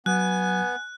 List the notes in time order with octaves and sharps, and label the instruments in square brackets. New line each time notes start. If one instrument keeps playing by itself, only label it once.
[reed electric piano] F#3 [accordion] B3 [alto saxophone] G#5 [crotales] F#6